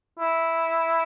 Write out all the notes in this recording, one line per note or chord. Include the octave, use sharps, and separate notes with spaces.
E4